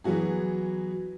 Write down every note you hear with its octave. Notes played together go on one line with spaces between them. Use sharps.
E3 F#3 B3 F#4 G#4